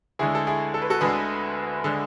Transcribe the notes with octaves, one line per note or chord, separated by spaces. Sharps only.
D2 D3 G#3 E4 G#4
A4
E4 G#4
A4
B4
F#4 A4
D2 D3 G#3 G#4 B4
D3 G#3